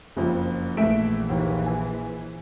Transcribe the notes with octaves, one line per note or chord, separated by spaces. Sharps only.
F#1 F2
A#1 E3 A3 E5 D7
D#2
G#5